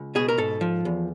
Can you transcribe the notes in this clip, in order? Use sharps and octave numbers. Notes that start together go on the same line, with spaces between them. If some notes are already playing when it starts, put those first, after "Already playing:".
Already playing: C#2
B2 G#4
A#4
G#2 A4
F3
E2